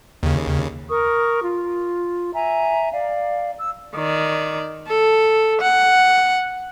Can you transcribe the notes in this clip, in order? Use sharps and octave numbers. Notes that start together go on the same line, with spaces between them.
D#2 C#3
A#4 C#6 D#6
F4
E5 G#5 A#5
D5 F5
E6
D#3 D5
A4
F#5